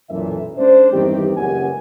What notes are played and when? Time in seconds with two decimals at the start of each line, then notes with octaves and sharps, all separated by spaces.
0.10 B1 F#2 A#2 E3 A4 E5
0.58 G#3 C#4 D4 C5
0.93 E2 G2 D#3 C4 D#4 G4
1.37 F#1 C#2 F#2 G4 F#5 G#5